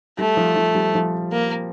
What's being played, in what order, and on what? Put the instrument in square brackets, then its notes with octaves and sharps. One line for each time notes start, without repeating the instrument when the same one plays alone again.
[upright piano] G3 [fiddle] A3
[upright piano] F3
F3
G3
F3
[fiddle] A#3